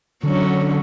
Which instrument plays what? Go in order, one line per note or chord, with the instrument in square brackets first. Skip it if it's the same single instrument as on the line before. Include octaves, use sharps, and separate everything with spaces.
[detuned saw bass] D3 [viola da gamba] F#3 C#4